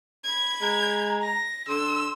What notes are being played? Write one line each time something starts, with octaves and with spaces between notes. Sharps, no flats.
B5 G#6
G#3 A#5
A#6
D3 C6 E6